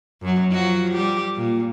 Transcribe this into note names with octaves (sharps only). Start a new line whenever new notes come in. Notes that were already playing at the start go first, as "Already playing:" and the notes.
F#2 F#3
F3 F#3 F#4
G3 G4
A#2